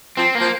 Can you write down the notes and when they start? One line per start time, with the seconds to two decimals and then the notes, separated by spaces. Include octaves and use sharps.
0.17 F3 C4
0.35 A#3
0.41 F3